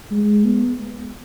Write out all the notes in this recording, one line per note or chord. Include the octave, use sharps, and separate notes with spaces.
G#3
B3